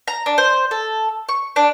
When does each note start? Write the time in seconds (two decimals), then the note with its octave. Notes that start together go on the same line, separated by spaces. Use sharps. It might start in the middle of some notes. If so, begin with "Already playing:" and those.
0.07 A#5
0.26 D4
0.38 C5
0.71 A4
1.29 C#6
1.56 D4